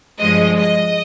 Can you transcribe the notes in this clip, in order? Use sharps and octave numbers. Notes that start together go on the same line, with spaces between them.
G2 F3 G#3 D#5
D#5